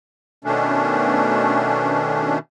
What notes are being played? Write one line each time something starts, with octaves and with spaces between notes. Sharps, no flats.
B2 D#3 A3 C#4 D4